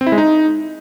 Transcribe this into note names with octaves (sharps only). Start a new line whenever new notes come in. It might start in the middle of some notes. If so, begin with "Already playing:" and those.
C4
E4
G#3
D#4